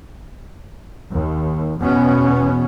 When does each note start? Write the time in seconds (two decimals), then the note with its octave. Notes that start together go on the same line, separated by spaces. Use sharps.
1.12 D#2
1.80 E2 B2 B3 C#4